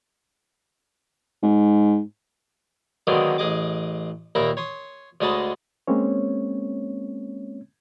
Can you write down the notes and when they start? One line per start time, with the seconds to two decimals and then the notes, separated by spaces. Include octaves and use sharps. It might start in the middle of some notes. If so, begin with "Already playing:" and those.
1.43 G#2
3.07 D3 D#3 F#3 G#3 A#3 B3
3.38 A1 G#4 D#5 D6
4.35 D#2 A#2 A#3 E5 A#5 B5
4.57 C#5 C6 D#6
5.21 D2 G#3 C#5 D#5 A5 B5
5.87 G#3 A#3 C4 C#4 C#5